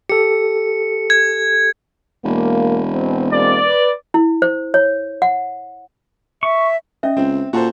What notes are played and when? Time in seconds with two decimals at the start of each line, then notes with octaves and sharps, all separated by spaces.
0.10 G4 A4 C#7
1.10 G#6
2.25 E1 A#3
2.92 B2 C4
3.30 G#3 A#3 C4 D5
3.66 B4
4.14 E4
4.42 C5
4.74 C#5
5.22 F#5
6.43 E5 C#6
7.03 C#4 D#5 E5
7.17 C#2 C4
7.53 A#2 F#4 A4 C5